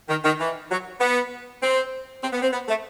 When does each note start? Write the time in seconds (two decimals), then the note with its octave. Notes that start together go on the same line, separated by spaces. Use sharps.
0.09 D#3
0.25 D#3
0.40 E3
0.71 F#3
1.01 B3
1.62 C4
2.23 C4
2.33 B3
2.42 C4
2.53 B3
2.69 A3